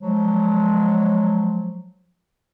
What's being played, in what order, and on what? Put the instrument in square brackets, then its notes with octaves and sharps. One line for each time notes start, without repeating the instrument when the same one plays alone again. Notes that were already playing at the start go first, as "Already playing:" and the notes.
[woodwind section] F3 F#3 G#3